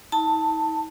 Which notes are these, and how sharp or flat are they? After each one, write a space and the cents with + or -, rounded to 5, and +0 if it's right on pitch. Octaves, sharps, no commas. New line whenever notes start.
D#4 +45 A5 +15